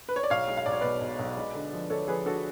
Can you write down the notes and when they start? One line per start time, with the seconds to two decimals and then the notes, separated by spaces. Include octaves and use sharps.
0.09 B4
0.16 C#5
0.23 D5
0.30 B1 C#5 F5
0.48 G#3
0.57 F5
0.66 B1 D5
0.73 C#5
0.81 B2 B4 D5
1.01 B1
1.19 B1
1.37 G#3
1.54 D3
1.73 F3
1.90 D3 A4 C#5
2.08 F3 G#4 B4
2.26 D3 F#4 A4